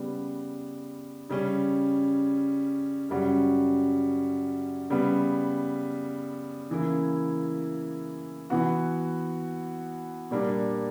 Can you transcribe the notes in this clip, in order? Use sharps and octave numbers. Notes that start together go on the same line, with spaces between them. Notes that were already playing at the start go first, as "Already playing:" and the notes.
Already playing: C#3 G3 B3
C#3 G3 C#4
F#2 C#3 G3 C#4 F#4
C#3 G3 B3
C#3 E3 A#3 E4
E3 B3 F#4
A#2 G3 A#3 D4